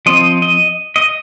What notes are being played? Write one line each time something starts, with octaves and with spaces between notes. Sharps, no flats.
F3 C4 D#5
D#5
D#5